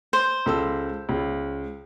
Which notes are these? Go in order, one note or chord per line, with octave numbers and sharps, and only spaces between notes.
C5
C#2 A4 E6
C#2